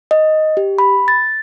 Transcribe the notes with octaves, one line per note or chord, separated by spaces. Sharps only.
D#5
G4
B5
A6